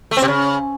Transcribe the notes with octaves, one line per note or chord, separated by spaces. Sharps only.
A3
C4
C3
C#3